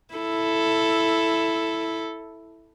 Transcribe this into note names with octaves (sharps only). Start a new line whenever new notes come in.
E4 A4